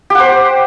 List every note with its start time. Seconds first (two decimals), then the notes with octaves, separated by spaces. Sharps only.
0.10 G4
0.15 F#5
0.20 C5